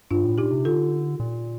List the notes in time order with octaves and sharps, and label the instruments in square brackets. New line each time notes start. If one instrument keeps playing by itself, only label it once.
[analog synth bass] G2 [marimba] D4 F4
[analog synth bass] A2
[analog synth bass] A#2 [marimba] D#4 G4
[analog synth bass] C3
[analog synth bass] D3 [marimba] F4 A4
[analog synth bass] A#2